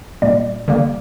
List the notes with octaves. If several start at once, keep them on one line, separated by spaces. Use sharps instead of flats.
A#2 G3 A#3 D5
D3 G3 A#3